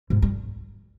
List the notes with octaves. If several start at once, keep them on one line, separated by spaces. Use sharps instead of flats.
G#2
G3